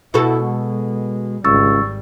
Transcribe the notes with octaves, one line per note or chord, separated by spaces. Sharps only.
B2 E4 F#4 A4
G#3
G#1 C#2 G3 C#6 E6 A6